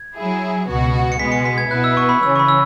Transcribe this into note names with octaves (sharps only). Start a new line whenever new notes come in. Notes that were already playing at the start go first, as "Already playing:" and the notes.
Already playing: G#6
F#3 E4 G#4
C#2 B2 B3 F#4
C#7
B2 G#3 B3 B6
C#7
B6
G#6
B2 B3 E4 B4 F#6
E6
C#6
B5
C#3 E3 C#4 E6
C#6
B5
E6